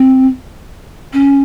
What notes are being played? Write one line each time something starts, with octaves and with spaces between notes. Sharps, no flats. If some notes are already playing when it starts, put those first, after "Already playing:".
Already playing: C4
C#4